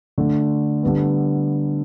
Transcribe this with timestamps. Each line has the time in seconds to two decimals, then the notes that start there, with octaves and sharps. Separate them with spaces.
0.18 D3 A3 D4
0.83 D3 G3 B3